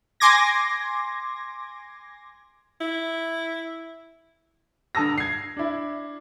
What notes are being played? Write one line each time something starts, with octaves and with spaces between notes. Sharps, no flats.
G#5 C6 D6 G#6 A#6
E4
G2 D3 A5 D#6 E6 A#6
G#6 C7
D4 E4